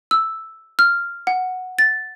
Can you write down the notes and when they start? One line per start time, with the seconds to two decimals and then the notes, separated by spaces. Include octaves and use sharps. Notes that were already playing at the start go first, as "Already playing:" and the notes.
0.11 E6
0.79 F6
1.27 F#5
1.79 A6